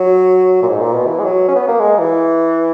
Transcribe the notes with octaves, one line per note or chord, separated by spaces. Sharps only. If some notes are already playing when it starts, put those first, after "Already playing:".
Already playing: F#3
A#2
G#2
A#2
B2
E3
G#3
F#3
C#4
B3
A#3
G#3
E3